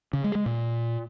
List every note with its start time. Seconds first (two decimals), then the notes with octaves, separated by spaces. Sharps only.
0.13 C#3
0.24 G#3
0.35 G#3
0.46 A#2